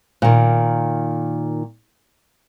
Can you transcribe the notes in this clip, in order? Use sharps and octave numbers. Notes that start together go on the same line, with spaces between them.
A#2 D#3